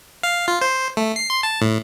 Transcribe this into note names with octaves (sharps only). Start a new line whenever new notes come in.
F5
F4
C5
A3
C7
C6
A5
A2